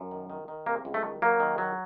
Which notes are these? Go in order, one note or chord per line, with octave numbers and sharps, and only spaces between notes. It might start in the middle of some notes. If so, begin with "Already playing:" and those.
Already playing: F#2
D#3
D#3
D#3
C3 A#3
C#2
A3
D#3
F#3 A#3
D#3
F#3